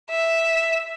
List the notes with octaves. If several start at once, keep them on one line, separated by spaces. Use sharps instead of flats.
E5